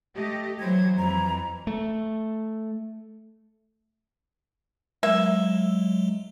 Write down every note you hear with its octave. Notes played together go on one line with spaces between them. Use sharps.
A3 G4 D#5
E3 F#3 C5 G#6
F2 E3 A#5
A3
F#3 G#3 A#3 E5